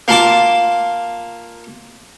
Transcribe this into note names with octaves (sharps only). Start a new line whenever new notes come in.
A#3 F4 A5 D6